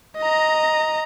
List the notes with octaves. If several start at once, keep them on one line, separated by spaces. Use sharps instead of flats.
D#5 A#5